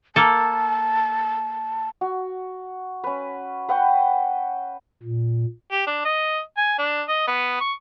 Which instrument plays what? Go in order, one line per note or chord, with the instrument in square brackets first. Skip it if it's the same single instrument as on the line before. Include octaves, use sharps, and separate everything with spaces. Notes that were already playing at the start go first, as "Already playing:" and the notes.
[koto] A#3 A4 [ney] A5
[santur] F#4
C#4 B4
B4 F#5 G5 C#6
[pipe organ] A#2
[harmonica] G4
D4
D#5
G#5
D4
D#5
B3
C#6